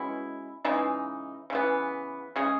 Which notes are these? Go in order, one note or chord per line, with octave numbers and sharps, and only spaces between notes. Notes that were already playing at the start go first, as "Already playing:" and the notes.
Already playing: B2 G#3 C#4 E4
C#3 E3 G#3 D#4
C#3 E3 B3
C#3 G#3 C#4 G#4